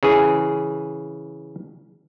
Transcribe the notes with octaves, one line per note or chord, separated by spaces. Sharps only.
C#3 E3 G#4